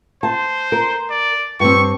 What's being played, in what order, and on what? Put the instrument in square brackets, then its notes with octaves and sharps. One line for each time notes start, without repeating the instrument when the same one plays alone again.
[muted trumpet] C5 [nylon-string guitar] A5
[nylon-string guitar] A#4
[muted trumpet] D5
[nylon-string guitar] G2 C4 [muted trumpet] C#6